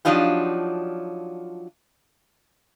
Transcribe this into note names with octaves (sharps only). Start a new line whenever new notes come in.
F3 F#3 D4 D#4 F4 G4